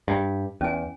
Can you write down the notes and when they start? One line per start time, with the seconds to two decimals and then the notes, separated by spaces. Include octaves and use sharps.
0.08 G2
0.61 E2 C#4 G#5